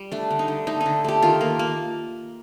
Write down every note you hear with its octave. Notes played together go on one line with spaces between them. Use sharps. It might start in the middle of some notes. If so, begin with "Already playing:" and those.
Already playing: G3
A3 D4
D3
D#4
D3
A3 D#4
D#4
D3
A3 G4
D#3 F4
A#3
A#3